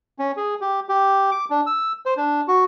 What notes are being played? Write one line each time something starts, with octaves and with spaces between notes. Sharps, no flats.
C#4
G#4
G4
G4
D6
D4
E6
C5
D4
F#4